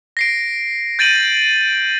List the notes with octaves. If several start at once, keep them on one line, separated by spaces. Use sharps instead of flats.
A#6 C7 D7
G6 A6 D7 D#7 F#7